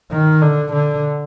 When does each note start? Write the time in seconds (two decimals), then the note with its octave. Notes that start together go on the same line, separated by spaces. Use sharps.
0.11 D#3
0.42 D3
0.73 D3